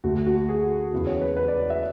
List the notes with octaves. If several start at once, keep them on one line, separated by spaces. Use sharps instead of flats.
D2 D3 A3 F#4
F#4
G#4
E2 C#3 E3 G#3
C#5
B4
B4
D5
D5
E5